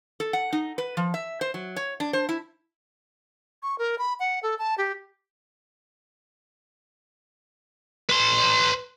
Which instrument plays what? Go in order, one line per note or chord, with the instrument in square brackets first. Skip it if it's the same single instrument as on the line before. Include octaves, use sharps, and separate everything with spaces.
[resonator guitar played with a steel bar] A4
F#5
D#4
B4
F3
E5
C5
F#3
C#5
D4
C5
E4
[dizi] C#6
A#4
B5
F#5
A4
A5
G4
[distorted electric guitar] B4 C6